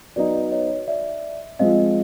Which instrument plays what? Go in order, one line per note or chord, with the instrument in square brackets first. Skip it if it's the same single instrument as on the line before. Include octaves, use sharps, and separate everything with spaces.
[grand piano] F#3 B3 D#4 [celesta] D5
[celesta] C#5 D#5
D5 E5
[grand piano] F3 G#3 C4 [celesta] D#5 F5